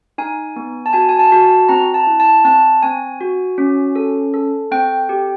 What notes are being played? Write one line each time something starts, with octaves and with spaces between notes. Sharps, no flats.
D#4 G#5
B3
A5
F#4 G#5
G#5
A5
F#4
A5
C4 A#5
A5
E4
A5
C4 A5
C4 G#5
F#4
C#4
A4
A4
C4 G5
G4